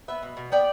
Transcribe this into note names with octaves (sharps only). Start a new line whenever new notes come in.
B3 B4 E5
B2
B2
B3 D5 G5